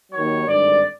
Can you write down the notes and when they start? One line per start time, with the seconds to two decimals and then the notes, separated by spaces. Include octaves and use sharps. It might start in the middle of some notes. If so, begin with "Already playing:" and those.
0.11 D#2 D#3 F#3 C#5
0.45 G#1 G2 D3 D5